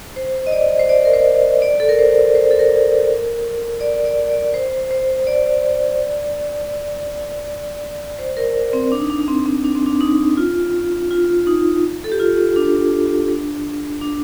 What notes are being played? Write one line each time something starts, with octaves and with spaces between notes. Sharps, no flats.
C5
D#5
D5
C5
D5
A#4
C5
D5
A4
A#4
C5
C5
A#4
A4
A#4
D5
D5
D5
C5
C5
D5
C5
A#4
C4
D4
D#4
D4
D4
C4
C4
D4
C4
D4
D#4
F4
F4
D#4
A4
G4
F4
D4
D4